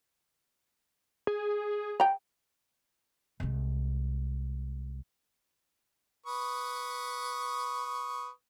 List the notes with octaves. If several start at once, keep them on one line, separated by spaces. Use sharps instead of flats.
G#4
G5 A#5
C2 G#3
B4 C#6 D#6